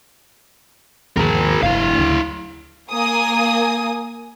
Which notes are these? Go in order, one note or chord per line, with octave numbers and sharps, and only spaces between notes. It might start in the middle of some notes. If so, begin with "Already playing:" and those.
D#2 B2 F3 G#4 A#4
F1 G2 E4 F5
D2 C#3 F#3
A#3 G#5 D#6